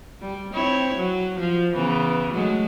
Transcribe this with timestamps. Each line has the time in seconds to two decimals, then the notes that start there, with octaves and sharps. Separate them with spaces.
0.21 G3
0.54 C4 E4 C#5
0.97 F#3
1.39 F3
1.75 C#3 E3 B3
2.32 F#3 G#3 A3